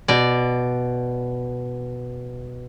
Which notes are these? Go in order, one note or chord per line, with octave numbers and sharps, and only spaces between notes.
B2 D5